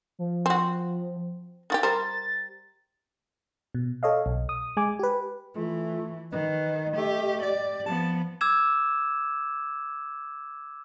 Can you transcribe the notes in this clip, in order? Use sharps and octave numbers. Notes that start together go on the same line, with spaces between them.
F3
C4 F#4
D#3 F#4 G4 A6
G3 A#4 C5
B2
A4 C#5 D#5 F5
B1
D#6
G#3 G#5 D6
G4 B4
E3 A3 F4
D#3 B4 D#5
A3 G4
G4 D5
F3 B3 A5
D6 E6 G#6 E7